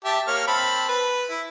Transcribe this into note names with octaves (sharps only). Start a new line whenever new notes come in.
G4 E5 A5
A#3 C#5 F6
C4 A5 B5
B4
E4